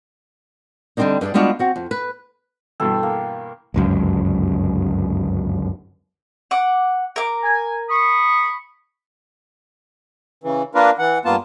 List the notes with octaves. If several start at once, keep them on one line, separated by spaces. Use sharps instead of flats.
D3 G3 G#3 C4 D4 D#4
G2 D4 D#4 G#4 D5
G3 G#3 B3 D4 F4 F#4
C4 F#4
F2
B4
G2 B2 E3 A4 G5
A#3
G1 C#2 F#2
F#5 D6
A#4 D6
G#5
B5 C#6 D#6
C#3 E3
A#3 D4 F4 A#4 B4
E3 F#5
G2 A#3 B3 F4 A5